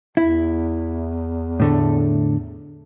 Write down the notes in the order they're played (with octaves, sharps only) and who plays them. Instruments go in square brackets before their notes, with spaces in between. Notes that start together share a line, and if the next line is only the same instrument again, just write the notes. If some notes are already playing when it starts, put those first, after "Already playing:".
[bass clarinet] E2 [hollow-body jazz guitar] E4
[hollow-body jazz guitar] A2 D3 A3